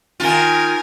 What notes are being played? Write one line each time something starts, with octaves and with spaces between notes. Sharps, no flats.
D#3 F4 A#4 G#5